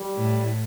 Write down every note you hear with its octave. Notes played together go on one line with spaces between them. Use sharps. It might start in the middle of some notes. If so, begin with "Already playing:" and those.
Already playing: G3
A2